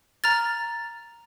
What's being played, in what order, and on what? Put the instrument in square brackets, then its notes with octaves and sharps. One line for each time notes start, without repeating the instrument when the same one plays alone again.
[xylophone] A#5 F6 A6